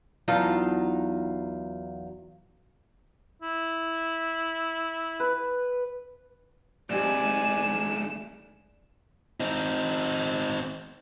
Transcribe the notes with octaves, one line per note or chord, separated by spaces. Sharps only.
E2 F#3 D#4 F4 F5 A5
E4
B4
D2 G#2 C4 D#4 G4 D5 G#5 E7
C4 D#4